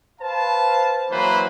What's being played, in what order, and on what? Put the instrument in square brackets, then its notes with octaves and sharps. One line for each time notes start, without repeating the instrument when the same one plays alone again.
[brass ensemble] B4 C5 F5 A5
E3 F#3 A#3 B4 C5